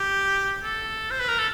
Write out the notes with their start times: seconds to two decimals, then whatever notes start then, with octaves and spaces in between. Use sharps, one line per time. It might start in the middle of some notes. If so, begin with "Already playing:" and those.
Already playing: G4
0.63 A4
1.11 C5
1.20 B4
1.29 A#4
1.38 A4